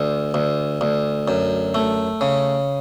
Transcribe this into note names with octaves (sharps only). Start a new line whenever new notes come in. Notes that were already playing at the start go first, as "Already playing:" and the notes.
Already playing: D2
D2
D2
F#2
A3
C#3